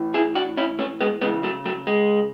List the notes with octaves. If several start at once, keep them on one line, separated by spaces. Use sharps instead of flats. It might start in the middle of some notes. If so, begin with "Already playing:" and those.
Already playing: A2 E3
E4 G#4
D4 F#4
C#4 E4
A3 C#4
G#3 B3
C#3 E3 G#3 B3
F#3 A3
F#3 A3
G#3